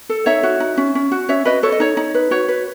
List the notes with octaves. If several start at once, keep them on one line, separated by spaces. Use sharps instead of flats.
A4
D#4 C#5 E5
F#4
D#4
C#4
C#4
F#4
C#4 C#5 E5
F#4 B4 D#5
A4 C#5
D#5
D#4 C#5
D#4
B4
F#4 C#5
B4